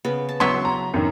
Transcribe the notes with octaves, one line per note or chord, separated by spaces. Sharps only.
C#3 B3
A5
F#3 B3 E4 C6
A#5
F#2 D#3